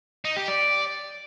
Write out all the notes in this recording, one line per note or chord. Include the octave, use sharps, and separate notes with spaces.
D#4
G4
D5